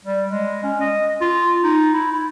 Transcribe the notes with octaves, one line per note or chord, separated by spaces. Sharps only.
G3
G#3
C#4
D#5
F4
D#4
E4
E4